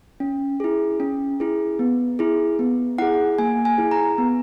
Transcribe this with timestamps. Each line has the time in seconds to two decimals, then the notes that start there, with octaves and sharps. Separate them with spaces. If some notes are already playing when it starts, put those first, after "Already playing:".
0.20 C#4
0.60 E4 G#4
1.00 C#4
1.40 E4 G#4
1.79 B3
2.19 E4 G#4
2.59 B3
2.98 E4 G#4 F#5
3.38 A#3 G#5
3.65 G#5
3.78 E4 G#4
3.91 A#5
4.18 B3